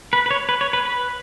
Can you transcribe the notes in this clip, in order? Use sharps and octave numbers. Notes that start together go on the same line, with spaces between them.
B4
B4
C#5
B4
C#5
B4
B4